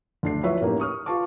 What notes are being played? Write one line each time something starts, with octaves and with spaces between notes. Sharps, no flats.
D2 D4 C7
F3 F#3 E4 B4 C#5 E5
A2 A#3 C#4 D#4 G4
C#6 D#6 F6
F4 B4 A5 C#6 D6